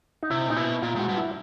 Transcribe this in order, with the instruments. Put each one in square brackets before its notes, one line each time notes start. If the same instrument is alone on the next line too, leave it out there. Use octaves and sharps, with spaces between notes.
[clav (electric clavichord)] D#4
[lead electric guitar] C3 [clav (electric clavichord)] E4
[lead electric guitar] A#2 [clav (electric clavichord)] D#4
[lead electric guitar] B2 [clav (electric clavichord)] E4
[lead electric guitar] A#2 [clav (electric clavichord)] F4
[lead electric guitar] G#2 [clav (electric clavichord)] F#4
[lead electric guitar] G2
[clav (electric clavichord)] E4